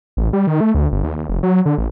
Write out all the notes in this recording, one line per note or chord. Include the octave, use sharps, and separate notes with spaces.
A1
G3
D#3
A3
D2
G1
D#2
D#2
F1
F#3
D3
A1